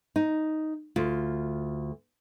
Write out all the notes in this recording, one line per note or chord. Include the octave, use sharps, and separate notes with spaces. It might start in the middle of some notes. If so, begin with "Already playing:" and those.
D#4
D2 F4